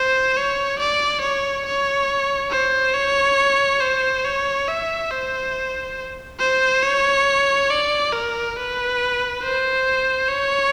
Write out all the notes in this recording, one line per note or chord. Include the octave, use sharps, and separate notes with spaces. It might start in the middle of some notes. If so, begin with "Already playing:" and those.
Already playing: C5
C#5
D5
C#5
C#5
C5
C#5
C5
C#5
E5
C5
C5
C#5
D5
A#4
B4
C5
C#5